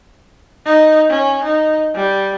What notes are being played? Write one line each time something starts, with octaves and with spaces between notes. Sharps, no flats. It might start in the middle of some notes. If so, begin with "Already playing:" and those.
D#4
C#4
D#4
G3